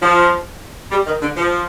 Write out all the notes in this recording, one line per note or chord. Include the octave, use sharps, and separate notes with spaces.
F3
G3
D#3
D3
F3